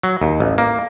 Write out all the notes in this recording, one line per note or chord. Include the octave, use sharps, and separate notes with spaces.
F#3
D#2
A1
A#3